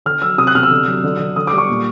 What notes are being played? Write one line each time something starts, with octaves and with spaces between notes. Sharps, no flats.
D3 F6
F#3 E6
C3 D#6
F#6
C3 F6
E6
D3
F#3
D3
D3
D3 D#6
G3 D6
C#6
A#2